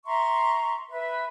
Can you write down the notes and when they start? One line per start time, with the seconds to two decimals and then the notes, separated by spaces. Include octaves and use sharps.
0.05 E5 A#5 C6 C#6
0.90 B4 E5